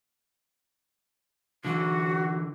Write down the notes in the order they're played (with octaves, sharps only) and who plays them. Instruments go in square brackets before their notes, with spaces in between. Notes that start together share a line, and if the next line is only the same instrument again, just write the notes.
[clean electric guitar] D3 E3 [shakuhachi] F#4